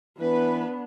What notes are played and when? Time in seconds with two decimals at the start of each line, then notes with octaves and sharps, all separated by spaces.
0.19 E3 B3 D4 B4